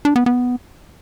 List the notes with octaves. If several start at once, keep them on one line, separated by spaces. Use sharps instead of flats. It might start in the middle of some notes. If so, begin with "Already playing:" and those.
D4
B3
B3